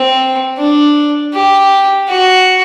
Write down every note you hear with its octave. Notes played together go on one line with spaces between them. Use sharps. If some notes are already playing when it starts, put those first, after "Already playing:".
Already playing: C4
D4
G4
F#4